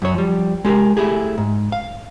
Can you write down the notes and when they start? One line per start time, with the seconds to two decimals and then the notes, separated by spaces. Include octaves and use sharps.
0.02 F#2 F#3 C#5
0.14 F3 G3
0.65 G#3 G4 G#4 A#4
0.97 A3 E4 G4 G#4
1.38 G#2
1.72 F5